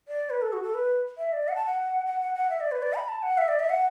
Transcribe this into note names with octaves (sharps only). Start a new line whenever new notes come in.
D5
B4
A4
F#4
A4
B4
E5
D5
F#5
A5
F#5
F#5
F#5
F#5
E5
D5
B4
D5
B5
A5
F#5
E5
D5
E5
F#5